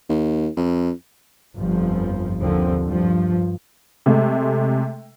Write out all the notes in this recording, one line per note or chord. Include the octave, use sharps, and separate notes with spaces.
D#2
F2
G1 F2 F3
D#2 D3 F3 C4
G2 F3
C3 G#3 A3